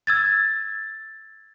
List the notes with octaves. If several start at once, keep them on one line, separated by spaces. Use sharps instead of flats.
E6 G#6 A6